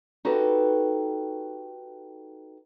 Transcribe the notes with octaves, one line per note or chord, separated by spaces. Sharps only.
D#4 F#4 G4 A4 B4